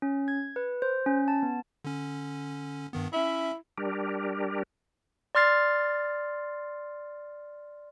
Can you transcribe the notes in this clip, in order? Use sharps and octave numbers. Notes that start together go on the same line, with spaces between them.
C#4
G#6
B4
C5
C#4
A5
B3
D3 C#4
G2 D#3 B3
C#4 E4 E5
G3 D4 G4 A#4
D5 C6 F6 A6 C7